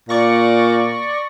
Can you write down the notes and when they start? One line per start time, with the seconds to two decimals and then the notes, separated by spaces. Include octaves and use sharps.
0.09 A#2 D5 C#6 A#6